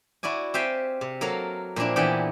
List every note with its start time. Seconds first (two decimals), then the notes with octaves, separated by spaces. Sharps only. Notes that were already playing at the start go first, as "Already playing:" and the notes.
0.23 E4 F#4 D5 G#5
0.54 C4 G4 E5 F5 G5 G#5
1.01 C3
1.21 F#3 A#3 A4 A#4 F5
1.76 A#2 F3 C4 D4 E4
1.96 A#2 E3 B3 D4 G4 G5